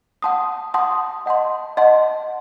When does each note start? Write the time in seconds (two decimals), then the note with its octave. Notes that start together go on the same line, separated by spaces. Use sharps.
0.22 F#5 A5 C6 D#6
0.74 F#5 A5 C6 D#6
1.26 D#5 F#5 A5 C6
1.77 D#5 F#5 A5 C6